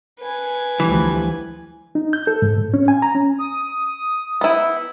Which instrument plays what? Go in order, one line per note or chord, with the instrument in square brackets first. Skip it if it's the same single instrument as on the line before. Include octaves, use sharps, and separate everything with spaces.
[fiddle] B4 G#5
[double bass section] D2 F3 G3 [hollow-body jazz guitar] E3
[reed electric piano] D#4
G6
A4
G#2
A2
C#4
G#5
A#5
C#4
[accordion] D#6
[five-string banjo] B3 E4